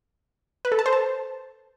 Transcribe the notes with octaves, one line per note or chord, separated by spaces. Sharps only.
B4
A4
A5
C5
A5